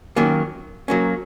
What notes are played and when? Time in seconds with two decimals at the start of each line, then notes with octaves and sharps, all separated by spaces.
0.16 D#3 F#3 A#3 C#4
0.88 F#3 A#3 C#4